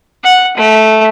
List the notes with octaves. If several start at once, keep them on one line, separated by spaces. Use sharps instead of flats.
F#5
A3